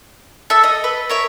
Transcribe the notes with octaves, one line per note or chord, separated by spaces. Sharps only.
A4 E5 E6
D#5
B4
A#4 C#5 E5